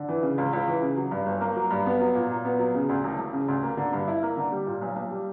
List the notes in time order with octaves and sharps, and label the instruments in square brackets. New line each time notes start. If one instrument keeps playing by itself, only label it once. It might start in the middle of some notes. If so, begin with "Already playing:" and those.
Already playing: [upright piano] D3
E3
C#3
C#2
C#2
E3
C#3
F#3
G2
G1
A#3
F#3
G2
B3
F#3
A#2
A#2
B3
F#3
C#3
D2
E1
E1
C#3
D2
A#3
D3
G2
E4
A#3
D3
G3
A#2
B1
B1
G3